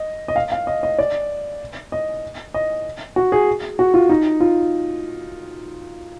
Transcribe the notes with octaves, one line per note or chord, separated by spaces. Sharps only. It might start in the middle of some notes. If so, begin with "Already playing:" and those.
Already playing: D#5
D#5
F5
F5
D#5
D#5
D5
D#5
D#5
F#4
G#4
F#4
F4
D#4
F4